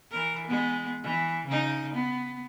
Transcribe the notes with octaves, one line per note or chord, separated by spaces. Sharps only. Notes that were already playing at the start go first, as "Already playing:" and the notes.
E3 A#4
G#3 B3
E3
C#3 D#4
B3